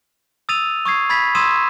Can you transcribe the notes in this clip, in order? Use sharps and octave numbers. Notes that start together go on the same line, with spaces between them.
D#6 E6 A6 D#7 F7
C#6 D#6 G#6 C7
B5 G#6 A6 B6
C6 D#6 E6 G#6 D#7 E7